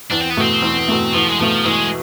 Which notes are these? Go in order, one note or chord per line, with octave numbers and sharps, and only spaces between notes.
E2 D4
C4
B3
B2 A3 C4
E2
B2 A3
E2 F3
G#3
B2 F3 A3
E2 G#3